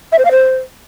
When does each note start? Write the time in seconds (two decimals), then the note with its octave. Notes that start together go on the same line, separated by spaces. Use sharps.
0.12 E5
0.18 C5
0.25 F5
0.31 C5